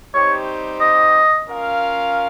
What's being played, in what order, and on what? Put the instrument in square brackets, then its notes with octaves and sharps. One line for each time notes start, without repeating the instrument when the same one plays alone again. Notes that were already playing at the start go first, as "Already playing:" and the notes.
[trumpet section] G3 C4 D#4 G4 C5 [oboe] C#5
[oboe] D#5
[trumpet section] C#4 F4 A#4 F5